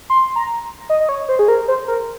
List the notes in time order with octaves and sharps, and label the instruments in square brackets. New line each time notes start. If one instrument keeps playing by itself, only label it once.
[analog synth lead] C6
A#5
D#5
D#5
C#5
C5
G#4
A#4
C5
A#4